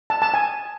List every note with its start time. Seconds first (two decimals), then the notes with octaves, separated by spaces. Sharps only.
0.10 A5
0.22 A5
0.34 G#5